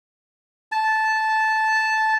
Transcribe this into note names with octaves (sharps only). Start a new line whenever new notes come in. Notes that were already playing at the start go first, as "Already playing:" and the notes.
A5